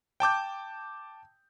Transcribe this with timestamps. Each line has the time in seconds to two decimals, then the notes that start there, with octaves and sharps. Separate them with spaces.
0.20 G5 A5 D6 G6